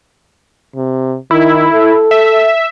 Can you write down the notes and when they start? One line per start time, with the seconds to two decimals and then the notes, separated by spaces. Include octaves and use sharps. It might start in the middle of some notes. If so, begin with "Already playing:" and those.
0.76 C3
1.31 D#3 E4
1.73 A4
2.11 E5